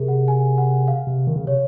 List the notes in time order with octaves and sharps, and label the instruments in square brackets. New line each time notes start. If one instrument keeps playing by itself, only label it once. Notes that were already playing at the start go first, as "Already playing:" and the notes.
Already playing: [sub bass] C3 [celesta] G#4 A#4
[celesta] F#5
G#5
F#5
F5
[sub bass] C3
D#3
C#3
[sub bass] C3 [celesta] C#5